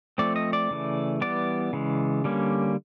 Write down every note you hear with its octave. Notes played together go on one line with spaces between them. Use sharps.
F3 A3 C4 D5
D#5
D5
C#3 E3 A3
E3 G3 B3 D5
C#3 E3 G#3
D3 G3 A#3 C#4